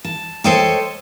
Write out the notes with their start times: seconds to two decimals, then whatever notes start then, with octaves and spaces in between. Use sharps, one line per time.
0.04 A5
0.44 A4 C5 C#5 D#5 G5 A5